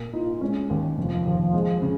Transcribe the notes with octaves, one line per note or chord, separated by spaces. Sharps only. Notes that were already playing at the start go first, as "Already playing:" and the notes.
Already playing: A#2
D#4 F4
G#3 C#4
D#2
F1 F3
D#2
G#3
C#3